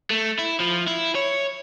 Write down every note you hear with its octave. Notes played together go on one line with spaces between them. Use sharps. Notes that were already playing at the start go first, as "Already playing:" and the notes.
A3
E4
F3
E4
C#5